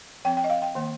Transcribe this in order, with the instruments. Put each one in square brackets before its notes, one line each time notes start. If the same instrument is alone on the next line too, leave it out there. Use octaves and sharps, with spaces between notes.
[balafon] F3 C4 G5
G5
D#5
F5
G5
D#3 A#3